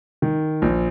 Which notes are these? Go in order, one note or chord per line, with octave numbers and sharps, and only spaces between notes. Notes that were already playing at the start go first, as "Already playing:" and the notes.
D#3
A#1